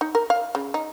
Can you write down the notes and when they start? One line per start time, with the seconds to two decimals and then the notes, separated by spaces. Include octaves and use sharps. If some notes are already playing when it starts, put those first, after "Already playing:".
0.01 D#4
0.15 A#4
0.30 F5
0.55 C#3
0.74 D#4